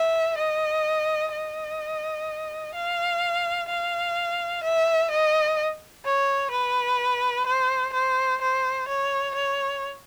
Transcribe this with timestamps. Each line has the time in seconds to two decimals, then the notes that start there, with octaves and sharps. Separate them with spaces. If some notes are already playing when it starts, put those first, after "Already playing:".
Already playing: E5
0.38 D#5
1.32 D#5
2.74 F5
3.69 F5
4.63 E5
5.11 D#5
6.05 C#5
6.51 B4
7.46 C5
7.93 C5
8.41 C5
8.88 C#5
9.35 C#5